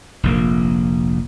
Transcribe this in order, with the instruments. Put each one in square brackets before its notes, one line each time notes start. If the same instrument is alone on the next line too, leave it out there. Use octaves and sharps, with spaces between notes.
[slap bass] F1 A#1 A#3